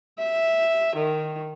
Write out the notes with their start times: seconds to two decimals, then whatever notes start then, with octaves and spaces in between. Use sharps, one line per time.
0.18 E5
0.95 D#3